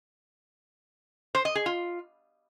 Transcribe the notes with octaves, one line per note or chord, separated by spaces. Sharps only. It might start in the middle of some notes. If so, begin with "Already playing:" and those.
C5
D#5
G#4
F4